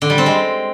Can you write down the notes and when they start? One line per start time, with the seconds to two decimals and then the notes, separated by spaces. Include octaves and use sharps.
0.02 D3
0.10 G3
0.18 C4
0.26 G#3